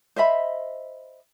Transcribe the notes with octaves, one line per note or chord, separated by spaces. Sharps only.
C5 D#5 E5 B5